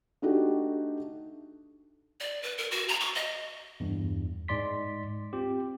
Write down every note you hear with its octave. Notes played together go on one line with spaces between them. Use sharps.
A3 D4 D#4 F#4 G4
D5
B4
A#4
F#4
A#5
C#6
D#5
E2 G2
G#2 G#3 D5 C6 B6
C4 F4 G4